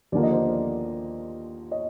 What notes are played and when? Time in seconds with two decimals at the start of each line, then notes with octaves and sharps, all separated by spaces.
0.12 D#2 D3 F3 A#3 D5
0.23 D#5
0.31 C5 D5
1.71 C#5 D#5